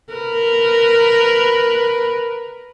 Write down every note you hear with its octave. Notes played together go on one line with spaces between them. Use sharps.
A#4 B4